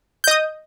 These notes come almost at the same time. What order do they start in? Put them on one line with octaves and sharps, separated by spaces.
G6 D#5 D#6